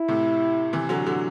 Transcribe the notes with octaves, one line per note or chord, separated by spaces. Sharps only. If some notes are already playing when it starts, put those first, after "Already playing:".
Already playing: E4
A2 C3
C3 E3
D3 F#3
D3 F#3